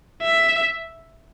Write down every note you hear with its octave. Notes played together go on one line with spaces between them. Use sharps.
E5